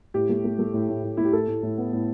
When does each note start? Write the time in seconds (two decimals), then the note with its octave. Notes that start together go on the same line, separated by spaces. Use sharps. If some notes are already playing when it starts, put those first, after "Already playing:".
0.14 A2 G4
0.29 A3
0.44 A3
0.59 A3
0.74 A2
0.89 A2
1.04 A2
1.17 A3 E4
1.25 G4
1.33 A2 A4
1.48 A2
1.63 A2
1.78 B3
1.93 A2